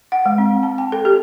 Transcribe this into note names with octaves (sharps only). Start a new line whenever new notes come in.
F#5
G#3
C4
A5
G5
A4
G4